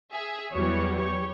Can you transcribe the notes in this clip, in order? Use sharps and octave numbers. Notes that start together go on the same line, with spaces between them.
G#4 E5
E2 E3 F#3 G3 F#4 C#5
G4 C#5